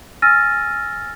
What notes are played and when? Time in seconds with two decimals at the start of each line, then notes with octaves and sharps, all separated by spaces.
0.22 G#5 E6 F6 A6 A#6 D#7